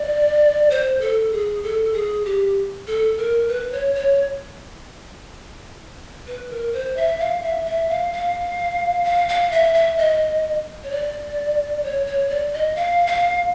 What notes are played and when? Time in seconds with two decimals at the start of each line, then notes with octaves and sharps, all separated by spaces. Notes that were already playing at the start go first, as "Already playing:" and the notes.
Already playing: D5
0.70 C5
1.01 A4
1.32 G#4
1.63 A4
1.94 G#4
2.25 G4
2.87 A4
3.18 A#4
3.48 B4
3.72 C#5
3.95 C#5
6.27 B4
6.50 A#4
6.73 C5
6.96 E5
7.20 F5
7.43 E5
7.66 E5
7.89 F5
8.12 F5
9.05 F5
9.29 F5
9.51 E5
9.74 E5
9.98 D#5
10.84 C#5
10.91 D5
11.83 C#5
12.07 C#5
12.30 D5
12.53 D#5
12.76 F5
13.07 F5